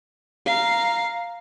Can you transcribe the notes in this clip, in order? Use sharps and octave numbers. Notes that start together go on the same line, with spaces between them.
F5 A#5